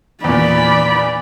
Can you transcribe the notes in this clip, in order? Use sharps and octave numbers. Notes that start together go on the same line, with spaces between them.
E2 A#2 D5 B5